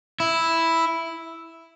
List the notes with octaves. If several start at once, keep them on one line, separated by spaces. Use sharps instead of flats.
E4